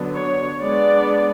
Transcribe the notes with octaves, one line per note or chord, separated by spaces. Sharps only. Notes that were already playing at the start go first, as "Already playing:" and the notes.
Already playing: D3 F#3 B3 D4
C#5
G#3 B3 D4 D5